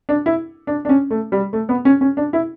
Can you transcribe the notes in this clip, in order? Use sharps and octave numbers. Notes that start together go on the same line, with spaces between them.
D4
E4
D4
D4
C#4
A3
G3
A3
B3
C#4
C#4
D4
E4